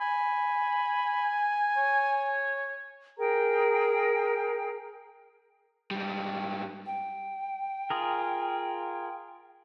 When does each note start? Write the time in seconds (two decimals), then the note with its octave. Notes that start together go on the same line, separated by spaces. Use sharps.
0.01 G#5 B5
1.77 C#5
3.18 G#4 A#4 G5 A#5
5.91 G#2 G3
6.86 G5
7.90 F4 G#4 A#4